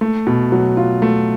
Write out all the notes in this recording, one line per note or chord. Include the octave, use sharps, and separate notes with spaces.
A3
B2
F#3
F4
A3